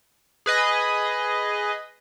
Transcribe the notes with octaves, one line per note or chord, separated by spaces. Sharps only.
G#4 B4 D#5